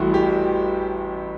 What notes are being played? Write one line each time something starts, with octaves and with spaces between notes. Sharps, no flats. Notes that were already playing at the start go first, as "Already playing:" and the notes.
Already playing: A1 A2 G3 E4 F#4
G4